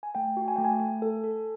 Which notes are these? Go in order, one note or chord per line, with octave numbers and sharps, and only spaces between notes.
G#5
A3 G5
F#4
G#5
A3 G5
G#5
A3 G#5
A4
A4